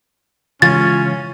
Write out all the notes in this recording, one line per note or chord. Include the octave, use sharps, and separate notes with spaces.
C#3 E3 G#3 C#4 F4 A6